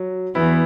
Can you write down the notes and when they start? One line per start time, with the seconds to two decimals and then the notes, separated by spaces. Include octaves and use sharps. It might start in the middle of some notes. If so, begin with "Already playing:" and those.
Already playing: F#3
0.35 E2 E3 B3 E4